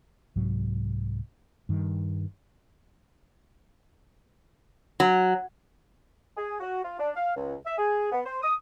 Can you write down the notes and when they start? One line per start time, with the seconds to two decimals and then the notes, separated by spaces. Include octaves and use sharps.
0.36 C2 G#2 F#3
1.69 G2 D#3
5.00 F#3
6.37 G#4
6.60 F#4
6.83 F4
6.99 D4
7.16 F5
7.36 C#2
7.66 E5
7.78 G#4
8.12 B3
8.25 C5
8.43 D#6